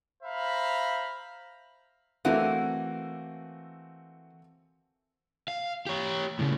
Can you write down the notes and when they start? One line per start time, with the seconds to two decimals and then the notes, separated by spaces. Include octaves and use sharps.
0.23 C5 E5 F5 A#5 B5
2.25 E3 A3 A#3 C4 F#4
5.48 F5
5.86 G4 C#5
6.39 A2 C#3